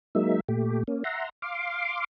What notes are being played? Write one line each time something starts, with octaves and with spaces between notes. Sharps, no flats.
F#3 G#3 A#3 D#4 E5
A#2 A3 G4
A#3 C#4
E5 F#5 A#5 C6
F5 C6 D6